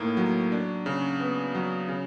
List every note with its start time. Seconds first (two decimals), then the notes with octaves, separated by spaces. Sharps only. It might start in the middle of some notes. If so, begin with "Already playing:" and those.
Already playing: A2 A#3 D#4
0.17 F#3
0.52 D4
0.86 C#3
1.20 B3
1.54 F#3
1.89 C#3